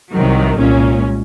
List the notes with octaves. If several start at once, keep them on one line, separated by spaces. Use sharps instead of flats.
C2 C3 D#3 F#3
C2 A#2 G#3 C#4